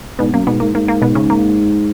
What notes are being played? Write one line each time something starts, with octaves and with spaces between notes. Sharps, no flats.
G#2 B2 B3
F#2 A#3
G#2 B2 B3
G#2 A#3
G#2 A#3
A#3
B2 B3
C#3 C#4
A#3